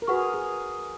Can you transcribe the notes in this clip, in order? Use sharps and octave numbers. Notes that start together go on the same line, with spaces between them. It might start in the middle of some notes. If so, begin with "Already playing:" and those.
A#4
F#4 G#4 B4 F#5 C#6
G#4